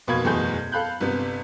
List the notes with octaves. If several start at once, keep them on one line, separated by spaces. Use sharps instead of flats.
F1 B2 A#3 B5 G#6
F#1 E2 B2 A3 G#4 G6
A4 F5 B5 F#6 G6
G1 C3 B3